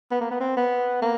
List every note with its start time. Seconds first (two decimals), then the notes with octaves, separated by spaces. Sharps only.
0.11 B3
0.21 A#3
0.31 B3
0.41 C4
0.57 B3
1.02 A#3